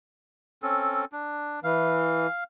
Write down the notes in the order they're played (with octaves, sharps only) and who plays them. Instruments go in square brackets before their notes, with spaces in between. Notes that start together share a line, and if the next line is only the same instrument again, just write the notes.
[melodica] C4 C#4 A4
D4
[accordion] E3 [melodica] F5